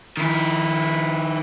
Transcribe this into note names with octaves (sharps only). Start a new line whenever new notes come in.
D#3 E4